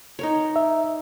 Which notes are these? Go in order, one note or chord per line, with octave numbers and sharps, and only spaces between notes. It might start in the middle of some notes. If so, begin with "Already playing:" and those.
D#4 A#4 C#5
E5